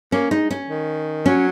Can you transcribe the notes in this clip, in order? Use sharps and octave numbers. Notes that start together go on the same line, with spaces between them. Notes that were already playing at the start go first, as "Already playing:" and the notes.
A#3 C#4
G#3 D#4
C#4
D#3
F#3 C#4